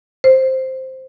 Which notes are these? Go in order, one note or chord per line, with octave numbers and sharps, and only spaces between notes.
C5